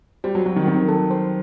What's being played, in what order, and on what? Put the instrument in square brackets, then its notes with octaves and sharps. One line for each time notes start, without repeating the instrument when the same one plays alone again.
[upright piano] G3 [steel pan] C5
[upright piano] F#3
[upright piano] F#3 [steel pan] F#4
[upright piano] D#3
[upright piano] D#3 [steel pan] C4
[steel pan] A4
C5